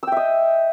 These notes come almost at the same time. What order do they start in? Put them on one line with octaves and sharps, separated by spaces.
E6 G5 E5 D#5